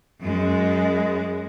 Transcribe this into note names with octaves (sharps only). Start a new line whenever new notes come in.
F#2 G#3